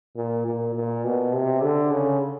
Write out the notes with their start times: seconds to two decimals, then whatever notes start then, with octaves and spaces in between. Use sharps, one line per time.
0.17 A#2
0.46 A#2
0.76 A#2
1.05 B2
1.34 C3
1.63 D3
1.92 C#3